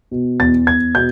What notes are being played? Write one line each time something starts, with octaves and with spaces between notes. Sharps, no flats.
B2
E2 A6
E2 G#6
B2 G6